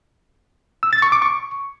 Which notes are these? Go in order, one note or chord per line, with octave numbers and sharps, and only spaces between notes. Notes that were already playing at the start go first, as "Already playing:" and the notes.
E6
A6
C#6
D6
C#6